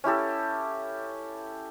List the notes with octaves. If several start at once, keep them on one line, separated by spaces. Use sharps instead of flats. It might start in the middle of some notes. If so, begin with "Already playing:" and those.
C#4 E4 G4 A4